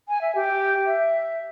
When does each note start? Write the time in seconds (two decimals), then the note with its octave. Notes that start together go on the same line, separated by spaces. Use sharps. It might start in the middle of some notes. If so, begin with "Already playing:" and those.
0.09 G#5
0.21 E5
0.35 G4
0.86 E5